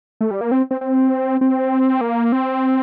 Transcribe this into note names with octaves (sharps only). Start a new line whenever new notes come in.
A3
G3
A#3
C4
C4
C4
C4
A#3
C4